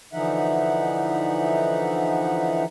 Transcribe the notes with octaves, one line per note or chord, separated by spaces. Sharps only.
D3 E3 F3 D#4 E5 F#5